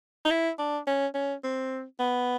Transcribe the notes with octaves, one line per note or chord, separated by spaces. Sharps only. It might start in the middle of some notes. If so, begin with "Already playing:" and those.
D#4
E4
D4
C#4
C#4
C4
B3